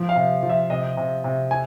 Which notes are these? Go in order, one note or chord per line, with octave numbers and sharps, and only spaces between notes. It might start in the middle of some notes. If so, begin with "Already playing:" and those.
Already playing: F3
F5
C3
F3
E5
C3 D#5
C3
C3
G#5